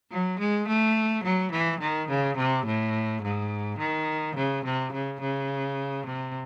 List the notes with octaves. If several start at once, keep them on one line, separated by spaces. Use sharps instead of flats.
F#3
G#3
A3
F#3
E3
D#3
C#3
C3
A2
G#2
D#3
C#3
C3
C#3
C#3
C3